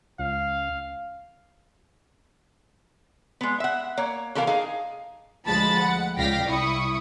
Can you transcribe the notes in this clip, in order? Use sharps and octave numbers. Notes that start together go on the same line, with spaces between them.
C#2 F5
G#3 B3
E5 F#5
A#3 C#5
B2 E3 A4 A#4 F5
D#4 G#4 F5
D2 F3 G#3 A5 B5 A6
F#5
C#2 D5 F5 G5 A#6 B6
C2 E4 C#6 D#6